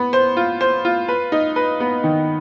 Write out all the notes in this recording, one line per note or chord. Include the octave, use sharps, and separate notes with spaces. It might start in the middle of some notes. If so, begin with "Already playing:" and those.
Already playing: B3
C5
F4
C5
F4
B4
D#4
B4
B3
D#3